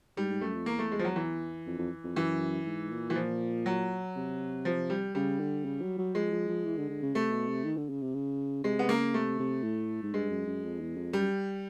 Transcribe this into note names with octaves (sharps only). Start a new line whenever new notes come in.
G#2 G3
G#2
F#2 A3
F2
E2 A#3
A3
G#3
F3
F#3
E3
F2
F2
F2
F#2 E3
G#2
A#2
E3
F3
F#3
C3
F3
G3
C#3 G3
D3
C#3
F#3
F#3
F3 G#3
F3
F3
E3
D3
D3
C#3
C3 A3
B2
C3
D#3
D3
C#3
C3
C#3
C3 G#3
B3
C#3 A#3
C3 A3
C3
A2
G#2
G2 G#3
F#2
F#2
F2
E2
F2
F#2 G3